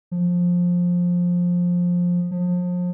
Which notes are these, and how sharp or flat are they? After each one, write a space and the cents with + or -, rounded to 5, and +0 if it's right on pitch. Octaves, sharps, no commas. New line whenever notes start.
F3 +15
F3 +35